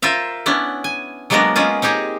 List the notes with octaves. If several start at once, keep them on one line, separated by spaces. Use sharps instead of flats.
F4 A#4 C5 E5 F5
B3 C#4 D4 E4
G#5
F#3 G#3 A#3 B3 D4 A#4
G#3 C#4 F4 G#4
C4 D#4 G4 G#4 A#5